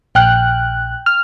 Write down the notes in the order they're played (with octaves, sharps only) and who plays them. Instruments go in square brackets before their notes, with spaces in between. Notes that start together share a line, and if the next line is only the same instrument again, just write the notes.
[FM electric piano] A#1 F#6 [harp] G5 F6
[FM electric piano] F6